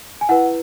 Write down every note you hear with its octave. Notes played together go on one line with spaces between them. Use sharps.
G#5
E4 B4 F#5